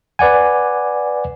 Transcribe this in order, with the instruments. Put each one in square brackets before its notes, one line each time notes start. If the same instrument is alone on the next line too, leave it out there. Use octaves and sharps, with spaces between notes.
[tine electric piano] B4 D5 F#5 G#5